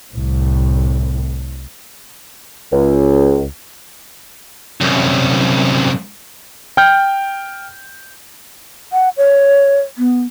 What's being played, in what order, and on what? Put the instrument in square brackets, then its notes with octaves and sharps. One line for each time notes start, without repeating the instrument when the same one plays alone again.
[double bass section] C2 A2
[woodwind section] C#2
[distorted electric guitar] C2 F#2
[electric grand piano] G5 F6 G6
[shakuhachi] F#5
C#5
B3